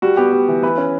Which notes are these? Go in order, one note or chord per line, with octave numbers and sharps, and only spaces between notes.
G3 F#4
B3 G4
G3
E3
E3 B4
C#4